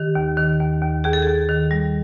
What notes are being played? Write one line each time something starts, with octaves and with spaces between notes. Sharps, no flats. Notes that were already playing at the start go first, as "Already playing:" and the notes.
Already playing: D#3 G4
D#2
D#3
D#2
D#2
D#2 G#4
A4
D#2 G#4
D#3
G3